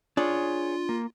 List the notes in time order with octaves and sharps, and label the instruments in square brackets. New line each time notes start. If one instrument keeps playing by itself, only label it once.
[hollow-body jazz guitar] D4 D5 [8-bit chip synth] F4 [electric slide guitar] G#4 C#5
[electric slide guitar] A#3